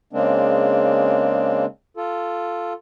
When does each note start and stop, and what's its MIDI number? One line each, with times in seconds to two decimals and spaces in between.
0.13 1.65 49
0.13 1.65 56
0.13 1.65 58
0.13 1.65 60
0.13 1.65 62
1.97 2.73 65
1.97 2.73 69